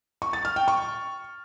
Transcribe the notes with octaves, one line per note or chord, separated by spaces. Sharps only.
C#6
A6
F6
G5
C#6